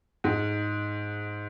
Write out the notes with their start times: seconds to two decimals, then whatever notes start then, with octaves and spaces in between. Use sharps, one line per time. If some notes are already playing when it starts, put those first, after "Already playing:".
0.24 G#2